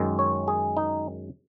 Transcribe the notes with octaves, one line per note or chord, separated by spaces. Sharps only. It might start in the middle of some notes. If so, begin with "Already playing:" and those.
Already playing: F#2 D#3 G#3
C#5
G#4
D#4